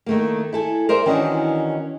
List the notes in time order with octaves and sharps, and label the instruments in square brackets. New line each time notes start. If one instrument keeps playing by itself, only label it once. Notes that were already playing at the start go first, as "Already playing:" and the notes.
[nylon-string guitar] D#3 A3 A#3
E4 A4 G#5
A#4 C5 D5 E5
D#3 E3 C#4 D4 F#4 D#5